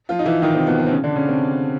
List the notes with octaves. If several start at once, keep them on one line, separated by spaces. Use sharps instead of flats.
F3 F4
D#4
E3 E4
D#3 D#4
C3 C4
B2 B3
B2 B3
C4
C#3 C#4
D3 D4
C#3 C#4
C3 C4